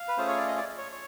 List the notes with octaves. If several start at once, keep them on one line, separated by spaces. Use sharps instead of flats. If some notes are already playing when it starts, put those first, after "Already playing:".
Already playing: F5
B4
A3 C#4 F4 G#4 C5
C#5
D5
D#5
D5
C#5
C#5